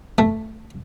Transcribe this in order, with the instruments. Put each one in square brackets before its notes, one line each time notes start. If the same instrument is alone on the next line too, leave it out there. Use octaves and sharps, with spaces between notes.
[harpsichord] A3